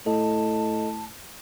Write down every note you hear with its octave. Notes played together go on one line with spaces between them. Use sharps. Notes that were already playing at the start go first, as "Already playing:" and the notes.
A2 A4 D#5 A5